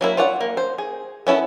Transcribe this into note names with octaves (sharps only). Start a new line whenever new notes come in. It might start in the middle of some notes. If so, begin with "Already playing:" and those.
F#3 A#3 E4
F4 C#5 D5 F#5
A#3
C5
G#4
B3 C#4 E4 A4